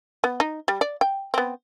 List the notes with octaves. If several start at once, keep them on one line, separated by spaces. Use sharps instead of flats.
B3
D#4
G3
D5
G5
B3 C4